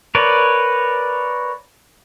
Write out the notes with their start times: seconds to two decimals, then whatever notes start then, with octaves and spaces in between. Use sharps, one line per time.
0.15 A#4 B4 C#5 D5